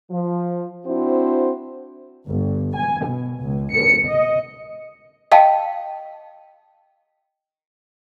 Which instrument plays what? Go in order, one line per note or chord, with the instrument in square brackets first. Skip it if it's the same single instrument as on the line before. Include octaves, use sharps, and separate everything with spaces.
[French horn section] F3
C4 D4 E4 F#4 C5
[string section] G1
G#5
B2
C#2
C#7
D#5
[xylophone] D#5 F5 G5 A5